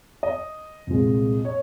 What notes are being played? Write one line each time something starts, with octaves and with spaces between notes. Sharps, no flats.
D#5
C2 A#2 F3 G#3
C#5